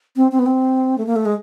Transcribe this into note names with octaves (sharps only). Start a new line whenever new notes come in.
C4
C4
B3
C4
A3
A#3
A3
G#3